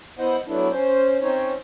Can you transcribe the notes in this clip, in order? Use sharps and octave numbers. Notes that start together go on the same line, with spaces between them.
B3 E4 C5 D#5 F#5
F#3 A3 B3 D4 E4
C#4 C5
C4 C#4 D#4 C5 C#5